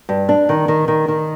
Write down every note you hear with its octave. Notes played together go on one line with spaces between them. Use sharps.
G2
D4
D#3
D#3
D#3
D#3